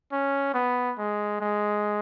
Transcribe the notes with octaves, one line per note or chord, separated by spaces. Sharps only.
C#4
B3
G#3
G#3